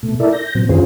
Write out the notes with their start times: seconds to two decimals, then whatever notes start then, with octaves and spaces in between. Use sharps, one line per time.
0.03 B2 A3
0.20 E4 A4 A#4 D5 E5
0.32 G6 A#6
0.55 A#2 F#3 C4
0.69 F#2 D#3 C#4 F4 G#4 C5